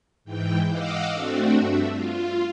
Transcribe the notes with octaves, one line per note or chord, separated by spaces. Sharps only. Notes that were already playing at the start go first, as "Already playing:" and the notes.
G#2 E3 G5
D#5 F5 F#5 D6 E6
A3 C4 D4 F#4
G2 E5
F4